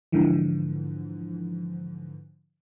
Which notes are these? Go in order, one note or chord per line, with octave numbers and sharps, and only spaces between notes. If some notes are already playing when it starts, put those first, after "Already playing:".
G#2 D3 E3 F3